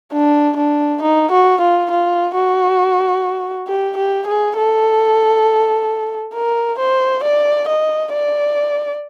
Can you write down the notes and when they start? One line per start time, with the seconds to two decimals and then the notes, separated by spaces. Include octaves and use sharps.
0.13 D4
0.57 D4
1.02 D#4
1.32 F#4
1.61 F4
1.91 F4
2.35 F#4
3.67 G4
3.97 G4
4.27 G#4
4.57 A4
6.34 A#4
6.79 C5
7.24 D5
7.68 D#5
8.13 D5